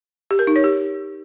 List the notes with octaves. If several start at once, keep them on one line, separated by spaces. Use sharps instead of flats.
G4
A#4
D#4
C#5
G4